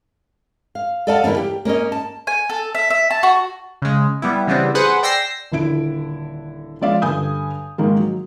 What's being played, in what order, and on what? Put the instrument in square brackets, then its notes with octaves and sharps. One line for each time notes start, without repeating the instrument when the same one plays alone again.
[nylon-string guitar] F5
A4 D5 D#5 F5 F#5 A5
D3 E3 G3 A#3 C#4
G4
A#3 C#4 C#5 D#5
A5
[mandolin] G#5
A4
E5
E5
A5
F#4
[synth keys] C#3 G#3
G3 B3 E4
C#3 E3 G3 B3 C4 D4
G#4 B4 C5 F#5
D5 G5 E6 A#6 C7
[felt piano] D#1 D3 E4 D7
F3 G#3 C#4 D5 E5 F5
G2 D3 G#5 D#6 G6
G#2 D#3 G#3 A#3
F#3